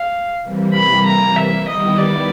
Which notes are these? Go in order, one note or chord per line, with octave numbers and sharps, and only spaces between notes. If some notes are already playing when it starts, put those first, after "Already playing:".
Already playing: F5
C3 E3 G3 A#3
B5
A#5
E5
D#3 G3 B3 E4 D#5
D5